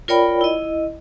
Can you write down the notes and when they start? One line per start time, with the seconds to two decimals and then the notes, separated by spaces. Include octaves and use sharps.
0.08 F4 A#4 C#5 D5 G5 B5
0.41 E4 D#5